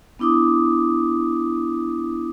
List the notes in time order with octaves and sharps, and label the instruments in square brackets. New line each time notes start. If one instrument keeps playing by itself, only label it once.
[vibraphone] B3 D4 E4 D6 D#6